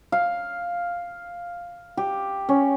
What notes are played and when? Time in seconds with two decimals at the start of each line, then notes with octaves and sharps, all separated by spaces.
0.12 F5
1.97 G4
2.49 C#4